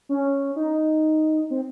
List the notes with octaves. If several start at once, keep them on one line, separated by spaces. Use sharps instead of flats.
C#4
D#4
C4